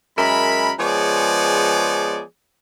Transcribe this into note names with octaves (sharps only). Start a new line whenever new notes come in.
F#2 G#3 A#4 E5 B5
F3 G#3 B3 G#4 C#5 D5